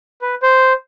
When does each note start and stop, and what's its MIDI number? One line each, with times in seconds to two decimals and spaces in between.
0.22 0.35 71
0.42 0.73 72